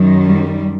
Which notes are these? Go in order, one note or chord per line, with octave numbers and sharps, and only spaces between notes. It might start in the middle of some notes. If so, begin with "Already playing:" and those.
Already playing: F#2 D#3
G3